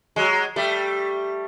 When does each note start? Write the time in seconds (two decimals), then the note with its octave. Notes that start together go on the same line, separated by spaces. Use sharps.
0.16 F#3 G#3
0.56 G3 A3